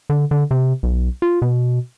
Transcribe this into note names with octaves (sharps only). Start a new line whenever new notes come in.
D3
D3
C3
B1
F4
B2